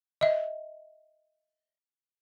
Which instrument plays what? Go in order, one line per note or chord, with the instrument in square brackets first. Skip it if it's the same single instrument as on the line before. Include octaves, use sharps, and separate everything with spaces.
[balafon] D#5 E5